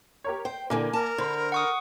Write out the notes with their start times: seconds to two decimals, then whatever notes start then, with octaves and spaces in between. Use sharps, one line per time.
0.24 G4 A#4 C#5
0.45 C5 G5
0.70 A#2 D3 E3 A#3 G#5
0.93 A#4 A5
1.18 D3 C5 B5 C6
1.52 F#5 C#6 D#6